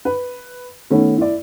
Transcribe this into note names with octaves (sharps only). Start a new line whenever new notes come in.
B4
D#3 A3 B3 C#4
E4 D5